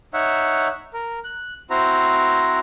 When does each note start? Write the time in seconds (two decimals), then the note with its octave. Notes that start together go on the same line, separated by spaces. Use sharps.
0.14 D#4 C#5 E5 F#5
0.93 A#4
1.24 F#6
1.70 C4 E4 F#4 C5 A#5